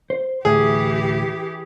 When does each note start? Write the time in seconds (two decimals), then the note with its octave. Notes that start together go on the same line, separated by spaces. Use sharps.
0.10 C5
0.45 D2 A2 E3 G4 G#4